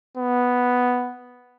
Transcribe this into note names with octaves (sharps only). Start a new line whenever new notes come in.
B3